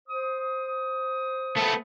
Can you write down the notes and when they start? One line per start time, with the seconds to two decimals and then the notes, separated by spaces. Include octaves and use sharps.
0.08 C5 D#6
1.57 A3 B3